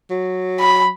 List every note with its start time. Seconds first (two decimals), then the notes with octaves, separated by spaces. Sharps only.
0.10 F#3
0.60 B5